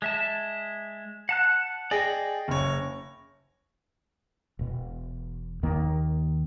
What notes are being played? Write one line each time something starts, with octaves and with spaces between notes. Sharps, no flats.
G#3 E5 A5
F#5 A5 F#6
G#4 D5 D#5 G5
F#1 C#5
E1 B2
D#2 D#3 A#3